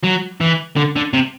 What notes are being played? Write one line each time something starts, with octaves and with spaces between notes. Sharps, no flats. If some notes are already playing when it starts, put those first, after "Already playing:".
F#3
E3
D3
D3
C3